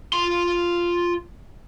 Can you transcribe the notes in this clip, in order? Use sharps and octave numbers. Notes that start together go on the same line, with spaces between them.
F4 C6